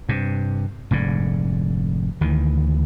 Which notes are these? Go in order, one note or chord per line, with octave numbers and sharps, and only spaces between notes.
G2 C3
F1 G#2 D3
D2 D#3 E3